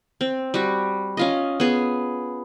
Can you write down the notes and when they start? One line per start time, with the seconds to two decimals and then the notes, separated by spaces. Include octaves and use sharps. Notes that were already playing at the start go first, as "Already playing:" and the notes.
0.21 C4
0.54 G3 F#4
1.17 C#4 F4 D#5
1.60 B3 G#4